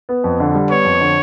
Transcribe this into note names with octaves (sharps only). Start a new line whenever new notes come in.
B3
F2
D3
G3
B3 C#5
F2
D3